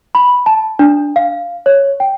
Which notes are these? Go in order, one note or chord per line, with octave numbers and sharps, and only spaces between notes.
B5
A5
D4
F5
C#5
G5